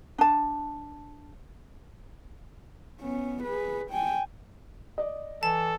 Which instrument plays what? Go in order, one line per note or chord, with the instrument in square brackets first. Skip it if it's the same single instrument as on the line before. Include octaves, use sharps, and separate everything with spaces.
[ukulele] D4 A5
[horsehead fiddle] B3 C#4
G#4 B4
G5 G#5
[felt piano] D5 D#5
[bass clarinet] E3 [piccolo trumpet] A4 [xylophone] A5